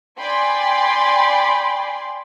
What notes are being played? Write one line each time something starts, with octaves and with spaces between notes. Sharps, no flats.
D5 G5 G#5 B5 C6